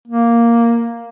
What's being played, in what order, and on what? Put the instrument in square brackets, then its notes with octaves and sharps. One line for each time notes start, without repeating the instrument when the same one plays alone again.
[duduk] A#3